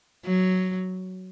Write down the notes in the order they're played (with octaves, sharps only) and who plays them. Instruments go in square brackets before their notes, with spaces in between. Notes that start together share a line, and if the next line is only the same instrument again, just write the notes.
[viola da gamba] F#3